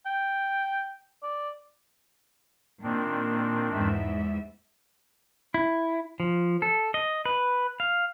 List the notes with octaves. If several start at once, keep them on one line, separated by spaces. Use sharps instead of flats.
G5
D5
A#2 D#3 C4 D4
E2 G#2 E5
E4
F3
A4
D#5
B4
F5